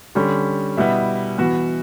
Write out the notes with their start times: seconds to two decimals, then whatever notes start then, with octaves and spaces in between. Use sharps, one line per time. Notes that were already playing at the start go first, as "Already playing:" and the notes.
0.15 D3 G3 C#4
0.77 B2 G3 B3 E4
1.38 E3 B3 F#4